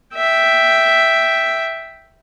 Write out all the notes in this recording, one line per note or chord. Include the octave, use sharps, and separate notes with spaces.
E5 G5